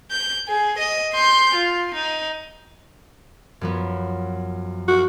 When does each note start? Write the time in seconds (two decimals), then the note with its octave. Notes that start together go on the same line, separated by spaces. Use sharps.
0.11 G6
0.48 G#4
0.79 D#5
1.14 C6 G6
1.55 F4
1.95 D#4
3.61 F#2 F3 B3
4.88 F#4